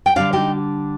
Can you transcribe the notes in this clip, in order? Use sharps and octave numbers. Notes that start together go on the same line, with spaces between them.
G5
D3 G3 D4 D5 F5
D#4 G4